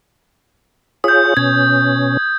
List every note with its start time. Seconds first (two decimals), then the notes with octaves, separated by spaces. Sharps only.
1.04 F4 G#4 C#5 D#6 G6
1.37 B2 C#4 G#6